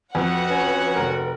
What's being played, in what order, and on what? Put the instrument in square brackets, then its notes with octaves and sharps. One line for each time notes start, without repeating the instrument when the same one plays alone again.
[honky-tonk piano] F2 [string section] F#4 F#5 [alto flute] B4
[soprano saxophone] C#4
[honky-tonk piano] F1 A#4